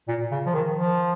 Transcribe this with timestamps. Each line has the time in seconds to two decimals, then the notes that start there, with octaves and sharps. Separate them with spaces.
0.08 A#2
0.31 C#3
0.46 F3
0.54 D#3
0.77 F3